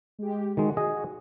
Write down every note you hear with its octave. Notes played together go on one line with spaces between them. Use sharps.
G#3 G4
D#3 G#3 F#4
G#4 D#5 G#5